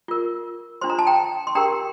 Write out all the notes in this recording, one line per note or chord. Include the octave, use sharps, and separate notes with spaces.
F4 A#4
D4 F4 C5 C6
A#5
A5
G5 A#5
C6
D4 G4 A#4 G5 A#5